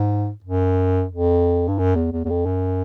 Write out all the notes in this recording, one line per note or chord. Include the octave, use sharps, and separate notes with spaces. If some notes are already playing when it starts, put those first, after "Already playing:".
Already playing: G#2
F#2
F2
G2
F#2
E2
E2
E2
F2
F#2